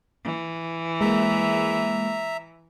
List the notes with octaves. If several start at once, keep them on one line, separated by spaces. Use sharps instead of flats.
E3
G#3 A#3 E5 A#5